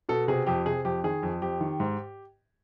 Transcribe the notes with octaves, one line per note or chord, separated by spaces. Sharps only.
B2 A4
C3 G#4
F2 G4
C3 G#4
F2 G4
D#3 G#4
F2
F2 G4
D#3
G#2